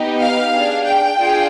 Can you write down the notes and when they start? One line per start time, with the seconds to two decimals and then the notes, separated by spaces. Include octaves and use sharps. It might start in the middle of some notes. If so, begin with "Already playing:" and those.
Already playing: B3 D#4 G4
0.21 F5
0.53 D4 G#4
0.85 G5
1.16 D4 F4 G#4